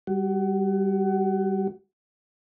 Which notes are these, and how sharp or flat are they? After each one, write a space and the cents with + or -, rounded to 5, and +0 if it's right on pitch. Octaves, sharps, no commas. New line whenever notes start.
G3 +0 F#4 +30